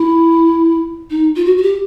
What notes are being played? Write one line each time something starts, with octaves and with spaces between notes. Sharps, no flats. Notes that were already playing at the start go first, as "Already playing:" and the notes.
Already playing: E4
D#4
F4
F#4
F#4
G4